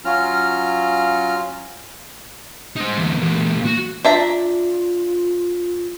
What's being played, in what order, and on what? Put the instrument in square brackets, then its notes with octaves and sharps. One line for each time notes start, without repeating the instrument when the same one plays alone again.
[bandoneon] F#3 C#4 F4 A#5 F6
[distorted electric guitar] D#4 C5
D2 E3
A#2 E3
F#4
[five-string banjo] D4 E5 A#5 [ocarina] F4